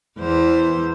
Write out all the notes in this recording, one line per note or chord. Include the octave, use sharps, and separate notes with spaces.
E2 E3 C5